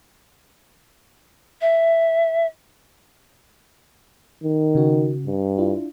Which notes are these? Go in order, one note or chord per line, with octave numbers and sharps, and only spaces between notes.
E5
D#3
C#3 F#4
G2
D4 E4 F4